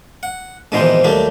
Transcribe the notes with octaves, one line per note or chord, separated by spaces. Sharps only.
F#5
A#1 G#2 B2 D#3 E3 C5
D#2 F#3 G3 A3